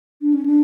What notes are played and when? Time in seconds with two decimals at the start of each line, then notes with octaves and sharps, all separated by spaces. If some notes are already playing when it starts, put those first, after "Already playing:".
0.22 D4
0.34 C#4
0.46 D4